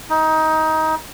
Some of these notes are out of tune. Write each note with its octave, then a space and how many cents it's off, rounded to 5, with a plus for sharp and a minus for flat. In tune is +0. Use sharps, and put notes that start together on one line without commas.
D#4 +20